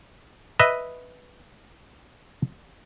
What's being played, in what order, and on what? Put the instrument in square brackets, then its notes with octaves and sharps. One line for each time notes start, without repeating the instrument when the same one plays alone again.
[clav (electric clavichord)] B4 D#5 E5